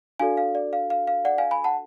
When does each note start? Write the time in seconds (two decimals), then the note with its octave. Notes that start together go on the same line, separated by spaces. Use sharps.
0.20 D4 F#4 A4 D5 F5 G#5
0.37 F5
0.55 D5
0.73 F5
0.90 F5
1.07 F5
1.25 D5 F#5
1.38 F5 G#5
1.51 G#5 B5
1.64 F#5 A5